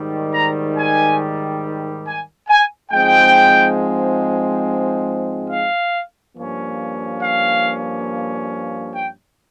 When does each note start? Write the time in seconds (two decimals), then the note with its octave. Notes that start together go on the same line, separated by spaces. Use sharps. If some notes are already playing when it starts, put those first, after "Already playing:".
Already playing: G#2 D#3 G3
0.34 A#5
0.77 G#5
2.07 G#5
2.49 G#5
2.92 G#2 F3 G#3 C4 G5
5.51 F5
6.37 G2 F3 A#3 C#4
7.23 F5
8.95 G5